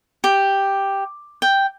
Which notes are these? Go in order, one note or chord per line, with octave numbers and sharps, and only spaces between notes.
G4
G5